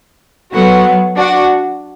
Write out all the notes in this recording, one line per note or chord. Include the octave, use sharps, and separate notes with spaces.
F#3 B3 F#4 A4 F#5
D4 F#4 D5 F#5